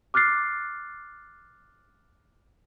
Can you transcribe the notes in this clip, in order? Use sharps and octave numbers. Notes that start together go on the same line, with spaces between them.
D6 F6 F#6 A6 C7